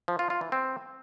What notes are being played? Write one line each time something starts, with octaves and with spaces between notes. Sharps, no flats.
F3
F4
F4
E3
C4